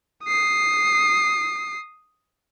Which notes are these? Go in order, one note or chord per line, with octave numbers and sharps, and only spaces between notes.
D#6 C7